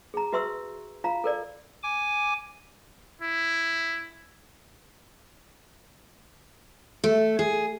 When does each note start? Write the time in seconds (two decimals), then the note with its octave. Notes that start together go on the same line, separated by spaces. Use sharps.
0.14 G#4 A#5
0.33 F#4 B4 E5 C6 C#6 E6
1.04 F4 F5 A#5
1.24 A4 A#4 D5
1.83 G#5 D6
3.22 E4
7.04 A3
7.39 G#4